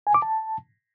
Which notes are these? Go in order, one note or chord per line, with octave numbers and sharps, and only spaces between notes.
G#5
D6
A5